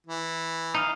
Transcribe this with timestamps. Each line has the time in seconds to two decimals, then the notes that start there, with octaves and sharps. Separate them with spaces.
0.06 E3
0.75 D#4 D#5 F5